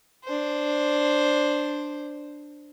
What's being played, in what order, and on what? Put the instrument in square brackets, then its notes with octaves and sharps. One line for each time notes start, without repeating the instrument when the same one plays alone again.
[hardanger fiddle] D4 C5